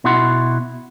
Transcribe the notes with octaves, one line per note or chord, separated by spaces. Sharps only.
B2 E4 F#4 F#5 C6